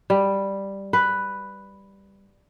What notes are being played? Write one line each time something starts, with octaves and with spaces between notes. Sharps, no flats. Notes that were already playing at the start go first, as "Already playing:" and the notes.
G3
B4